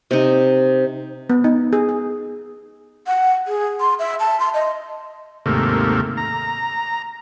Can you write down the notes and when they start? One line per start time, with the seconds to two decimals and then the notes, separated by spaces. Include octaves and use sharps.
0.11 C3 D#4
1.30 B3
1.44 D#4
1.73 G#4
1.89 G#4
3.07 F#5
3.47 G#4
3.80 C6
3.99 E5
4.20 A5
4.40 C6
4.54 D#5
5.46 D#2 G#2 C3 A3 A#3
6.17 A#5